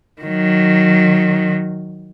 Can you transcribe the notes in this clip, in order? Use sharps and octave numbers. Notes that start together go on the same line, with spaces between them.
D#3 F#3